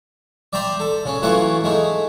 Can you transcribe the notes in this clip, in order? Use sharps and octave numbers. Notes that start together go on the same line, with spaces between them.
D5 E5 G5 A#5 C6
A4
C#3 C#4
E3 F#3 A3 F4 F#5
G#3 A3 D#4